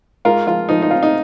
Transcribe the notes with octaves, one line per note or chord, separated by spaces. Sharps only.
G#2 F4 A#4
F3 F4
F3 D#4
D#4
C4 F4
D#4